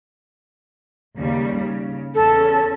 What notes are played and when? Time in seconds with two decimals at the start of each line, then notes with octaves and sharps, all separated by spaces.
1.17 D#2 C#3 G3
1.58 C#3
2.15 E2 C#4 A4